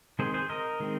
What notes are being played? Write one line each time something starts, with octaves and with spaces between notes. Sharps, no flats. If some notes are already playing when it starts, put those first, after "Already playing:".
D#3 G#3 C4 G#4 C5
G#4 C5
A#4 D#5
D#3 G#3 C4